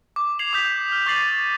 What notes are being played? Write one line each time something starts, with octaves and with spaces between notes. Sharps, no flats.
D6
G#6 C7 F7 F#7
D6 D#6 G6 B6
F6
C#6 D6 G6 A6 C7 F#7
F#7